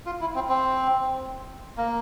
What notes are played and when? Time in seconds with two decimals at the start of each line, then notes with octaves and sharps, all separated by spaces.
0.06 F4
0.21 E4
0.35 C4
0.49 C4
1.78 A#3